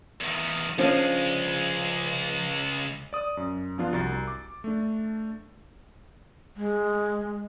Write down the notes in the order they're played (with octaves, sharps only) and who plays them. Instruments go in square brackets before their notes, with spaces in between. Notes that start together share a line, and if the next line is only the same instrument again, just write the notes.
[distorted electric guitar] E2 D#3
[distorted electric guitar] C#2 G#3 [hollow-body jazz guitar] F3 C#4 D4
[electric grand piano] D5 D#6
F#2
F3 B3 D4 F4
C2 F#4 A#5 A6
D6
A3 D4
[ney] G#3